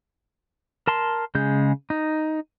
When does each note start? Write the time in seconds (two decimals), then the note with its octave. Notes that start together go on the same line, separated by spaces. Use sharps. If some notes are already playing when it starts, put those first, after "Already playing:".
0.87 A#4 A5 C6
1.35 C#3 G#3 G6
1.90 D#4